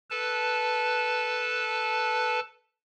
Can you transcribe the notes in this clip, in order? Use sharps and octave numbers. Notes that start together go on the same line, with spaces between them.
A4 B4 A5